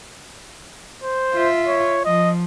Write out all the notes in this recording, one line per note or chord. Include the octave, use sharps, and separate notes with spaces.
C5
F4 E5
C#5
F3 D#5